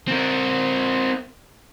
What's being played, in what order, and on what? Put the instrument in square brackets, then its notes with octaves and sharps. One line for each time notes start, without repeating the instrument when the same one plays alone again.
[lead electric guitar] C4 A#4